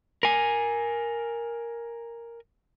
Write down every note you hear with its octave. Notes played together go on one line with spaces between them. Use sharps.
A#4 G#5